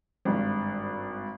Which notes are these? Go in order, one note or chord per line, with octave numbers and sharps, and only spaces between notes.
G#1 G2